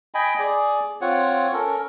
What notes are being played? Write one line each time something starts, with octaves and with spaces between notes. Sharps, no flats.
D#5 G5 G#5 B5
G#4 D5
C4 F4 C#5 F#5
C#4 A4 A#4